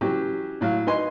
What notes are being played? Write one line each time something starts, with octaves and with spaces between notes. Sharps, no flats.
E3 F#3 C#4 F#4 G4
A2 F#3 F5
D#4 B4 G#5 C6